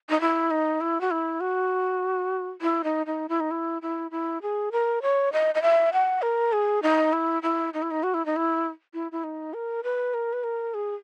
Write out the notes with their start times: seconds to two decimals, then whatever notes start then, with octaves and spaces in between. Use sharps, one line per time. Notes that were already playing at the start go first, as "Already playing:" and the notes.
0.10 D#4
0.21 E4
0.51 D#4
0.81 E4
1.01 F#4
1.11 E4
1.40 F#4
2.62 E4
2.84 D#4
3.06 D#4
3.29 E4
3.40 D#4
3.51 E4
3.82 E4
4.11 E4
4.42 G#4
4.72 A#4
5.02 C#5
5.33 D#5
5.55 D#5
5.62 E5
5.93 F#5
6.22 A#4
6.53 G#4
6.83 D#4
7.13 E4
7.43 E4
7.74 D#4
7.82 E4
7.91 D#4
8.03 F#4
8.14 E4
8.26 D#4
8.36 E4
8.94 E4
9.12 E4
9.24 D#4
9.54 A#4
9.84 B4
10.14 A#4
10.33 B4
10.44 A#4
10.74 G#4